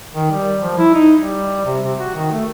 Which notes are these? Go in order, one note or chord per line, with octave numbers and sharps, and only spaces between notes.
D#3
G3
F3
E4
D#4
G3
C3
C3
F#4
D#3
A3